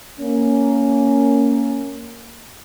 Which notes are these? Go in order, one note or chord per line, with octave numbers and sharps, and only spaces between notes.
A#3 C#4